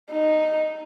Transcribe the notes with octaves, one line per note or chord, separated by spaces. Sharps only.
D#4